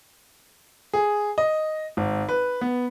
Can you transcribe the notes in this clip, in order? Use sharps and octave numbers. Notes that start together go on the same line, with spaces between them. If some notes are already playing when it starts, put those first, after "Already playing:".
G#4
D#5
G#1
B4
B3